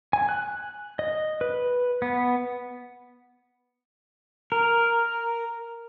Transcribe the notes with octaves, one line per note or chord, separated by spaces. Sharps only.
G#5
F#6
D#5
B4
B3
A#4